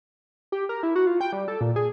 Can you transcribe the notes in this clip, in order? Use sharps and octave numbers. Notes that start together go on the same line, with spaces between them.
G4
A#4
E4
F#4
F4
G5
G3
A4
A#2
G#4